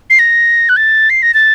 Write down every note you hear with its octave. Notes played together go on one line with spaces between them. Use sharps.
C7
A#6
F#6
A6
C7
A#6
A6